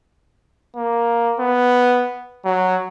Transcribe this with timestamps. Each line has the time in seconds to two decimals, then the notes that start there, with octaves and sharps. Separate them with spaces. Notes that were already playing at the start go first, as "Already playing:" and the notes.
0.76 A#3
1.40 B3
2.45 F#3